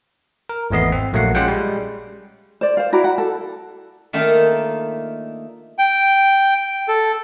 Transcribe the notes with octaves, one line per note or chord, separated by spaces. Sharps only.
A#4
G#1 E2 A3 B3 D#5 C7
C4
A#1 F#3 A3 A#3 F#5 C7
G#3 C#4 F4 F#5 G5
G3 G#3
C5 D5
C5 F5
E4 F#4 D5 A#5
F#5
A4
D#3 A3 A#3 D4 D#4 F4
G5
A4